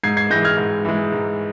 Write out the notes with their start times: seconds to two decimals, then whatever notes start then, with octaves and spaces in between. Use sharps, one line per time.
0.04 G#2 G#6 C7
0.17 G#6 C7
0.30 E3 G#3 G6 A#6
0.45 F6 G#6
0.58 G#2
0.85 E3 G#3
1.12 G#2